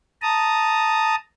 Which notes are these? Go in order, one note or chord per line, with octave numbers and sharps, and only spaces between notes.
A5 A#5 D#6